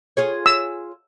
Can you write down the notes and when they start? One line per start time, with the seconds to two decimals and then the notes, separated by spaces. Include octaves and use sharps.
0.17 F4 G#4 C#5
0.46 E6